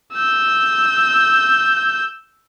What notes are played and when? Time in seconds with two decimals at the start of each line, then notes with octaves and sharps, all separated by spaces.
0.13 E6 G6